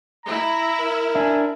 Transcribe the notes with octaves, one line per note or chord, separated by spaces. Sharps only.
E4 A#5
A#4
D4 E5 G#5